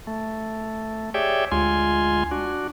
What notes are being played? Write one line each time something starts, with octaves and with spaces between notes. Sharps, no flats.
A3
G4 G#4 C#5 D5 E5 G5
D2 G#3 F4 G#5 C6
D4 F#4